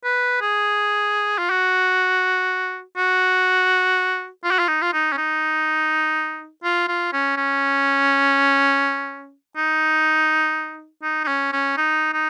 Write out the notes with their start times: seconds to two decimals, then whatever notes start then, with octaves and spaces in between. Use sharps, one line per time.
0.04 B4
0.41 G#4
1.38 F4
1.50 F#4
2.97 F#4
4.44 F4
4.51 F#4
4.59 F4
4.68 D#4
4.82 F4
4.93 D#4
5.13 C#4
5.18 D#4
6.64 F4
6.88 F4
7.13 C#4
7.37 C#4
9.57 D#4
11.03 D#4
11.24 D#4
11.28 C#4
11.53 C#4
11.77 D#4
12.13 D#4